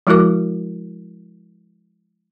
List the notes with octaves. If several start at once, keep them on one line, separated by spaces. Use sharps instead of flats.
F3 G#3 E4 F#4 A#4 D6